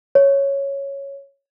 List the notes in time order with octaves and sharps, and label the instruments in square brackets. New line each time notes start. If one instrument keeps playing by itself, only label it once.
[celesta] C#5